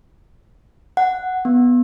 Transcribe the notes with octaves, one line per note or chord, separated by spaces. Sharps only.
F#5
B3